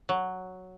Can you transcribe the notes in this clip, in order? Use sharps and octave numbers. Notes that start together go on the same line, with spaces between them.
F#3